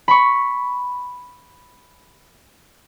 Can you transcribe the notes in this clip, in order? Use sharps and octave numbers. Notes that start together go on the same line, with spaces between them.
B5 C#6